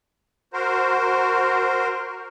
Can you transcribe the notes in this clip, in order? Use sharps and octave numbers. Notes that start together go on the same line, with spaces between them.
F#4 A#4 C5